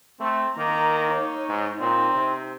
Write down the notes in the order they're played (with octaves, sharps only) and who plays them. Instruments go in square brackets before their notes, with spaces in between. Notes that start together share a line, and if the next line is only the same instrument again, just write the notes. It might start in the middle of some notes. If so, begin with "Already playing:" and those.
[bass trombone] A3 [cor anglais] C4
[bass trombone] D#3 [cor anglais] A#3 [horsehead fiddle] A#5
[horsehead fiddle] D#4 C#5
[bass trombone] G#2
[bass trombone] A#2 [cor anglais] C4 [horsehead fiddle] D#4
[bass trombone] C3